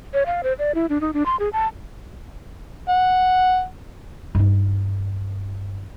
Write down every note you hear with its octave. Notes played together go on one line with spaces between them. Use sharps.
C#5
F5
C5
D5
E4
D4
D#4
D4
C6
G#4
A5
F#5
G2 D#4